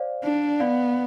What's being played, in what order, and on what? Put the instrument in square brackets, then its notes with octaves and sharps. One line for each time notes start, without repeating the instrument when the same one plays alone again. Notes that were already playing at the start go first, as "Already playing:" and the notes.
Already playing: [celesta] C5 D5 F5
[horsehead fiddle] D4
[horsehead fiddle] B3 [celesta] D5 F5